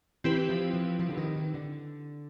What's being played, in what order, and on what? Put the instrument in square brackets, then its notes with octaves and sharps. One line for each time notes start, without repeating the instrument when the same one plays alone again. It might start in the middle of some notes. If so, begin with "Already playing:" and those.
[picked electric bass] E3 [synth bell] C4 E4 G4 B4
[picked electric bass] F3
F3
F3
D3
D#3
D#3
D3